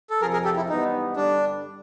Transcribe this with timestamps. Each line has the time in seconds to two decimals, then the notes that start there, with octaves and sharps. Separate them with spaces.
0.10 A4
0.21 F2 C3 F3 G#4 A#4
0.33 G#4 A#4
0.44 G4 A4
0.56 E4
0.69 G#2 E3 G3 B3 D#4
1.16 G2 D3 G3 D4